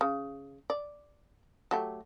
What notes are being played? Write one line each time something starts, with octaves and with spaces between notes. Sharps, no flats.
C#3
D5
F#3 A3 G4